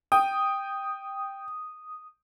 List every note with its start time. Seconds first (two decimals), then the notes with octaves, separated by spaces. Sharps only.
0.12 G5 D#6